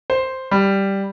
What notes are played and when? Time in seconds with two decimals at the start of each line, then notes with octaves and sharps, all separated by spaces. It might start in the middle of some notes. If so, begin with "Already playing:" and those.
0.10 C5
0.51 G3